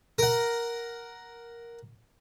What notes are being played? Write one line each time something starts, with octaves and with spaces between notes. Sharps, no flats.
A#4 F#5